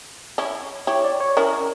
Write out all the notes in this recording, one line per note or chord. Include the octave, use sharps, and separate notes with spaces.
C#4 E4
E4 G4 C#5
D5
C#5
C#4 E4 A#4